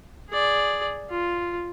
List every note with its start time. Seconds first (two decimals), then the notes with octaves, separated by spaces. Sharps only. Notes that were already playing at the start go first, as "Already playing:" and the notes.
0.29 G#4 D5
1.10 F4